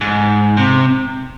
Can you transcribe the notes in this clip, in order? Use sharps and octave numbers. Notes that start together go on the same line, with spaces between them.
G#2
C3